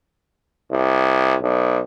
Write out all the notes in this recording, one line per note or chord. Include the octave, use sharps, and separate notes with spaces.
C2
B1